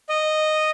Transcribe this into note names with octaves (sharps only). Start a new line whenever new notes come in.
D#5